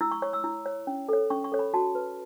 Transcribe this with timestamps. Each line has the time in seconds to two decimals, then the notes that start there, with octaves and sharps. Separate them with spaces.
0.01 E4 E6
0.11 C#6
0.22 C#5 C#6
0.33 E6
0.44 E4
0.66 C#5
0.87 C#4
1.09 A4 C#5
1.30 C#4 C#6
1.44 C#6
1.52 A4 C#5
1.59 B5
1.74 F#4 A5
1.95 B4